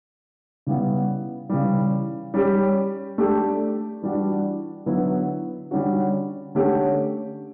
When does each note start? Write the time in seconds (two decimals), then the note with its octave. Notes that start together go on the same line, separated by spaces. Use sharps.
0.67 C#3 G3 B3 E4
1.50 C#3 E3 G3
2.34 G3 C#4 G4
3.18 A3 D4 G4
4.02 E3 G3 D4 F#4
4.86 D3 F#3 B3 E4 B4
5.71 D3 G3 C#4 F#4
6.55 D3 A3 C#4 G4 C#5